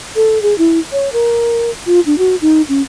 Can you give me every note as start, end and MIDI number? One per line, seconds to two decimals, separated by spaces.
0.16 0.41 69
0.42 0.57 68
0.58 0.79 64
0.92 1.12 73
1.13 1.70 70
1.87 2.00 65
2.06 2.18 62
2.18 2.36 66
2.42 2.62 63
2.69 2.81 61